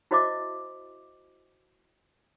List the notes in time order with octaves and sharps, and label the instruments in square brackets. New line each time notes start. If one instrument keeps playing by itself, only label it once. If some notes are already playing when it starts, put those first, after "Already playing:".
[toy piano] E4 F#4 C5 D#5 E5 D6